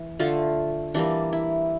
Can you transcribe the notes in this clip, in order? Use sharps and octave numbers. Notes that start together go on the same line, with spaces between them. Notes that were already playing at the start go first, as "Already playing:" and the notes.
Already playing: E3
D3 A3 F4
E3 G3 A#3 D4
E4